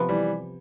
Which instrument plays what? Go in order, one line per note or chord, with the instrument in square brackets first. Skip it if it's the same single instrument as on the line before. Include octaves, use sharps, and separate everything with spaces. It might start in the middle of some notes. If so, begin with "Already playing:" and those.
Already playing: [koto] C3 F3 B3
[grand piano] E3 G3